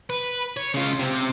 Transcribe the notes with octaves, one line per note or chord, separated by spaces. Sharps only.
B4
C#5
C#3 F4
C3 C4